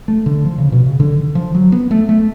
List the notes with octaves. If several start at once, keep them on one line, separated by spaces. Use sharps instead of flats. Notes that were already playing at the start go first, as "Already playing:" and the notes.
A3
D3
F3
C#3
B2
C#3
D3
D3
F3
F#3
B3
A3
A3